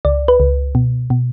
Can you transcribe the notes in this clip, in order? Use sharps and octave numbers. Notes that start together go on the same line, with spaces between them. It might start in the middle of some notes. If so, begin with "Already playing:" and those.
C#2 D5
B4
C#2
B2
B2